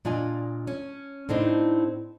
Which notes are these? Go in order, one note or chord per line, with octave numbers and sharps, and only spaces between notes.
A#2 D4 F4 D#5 G#5
C#4
A2 C4 D4 D#4 C5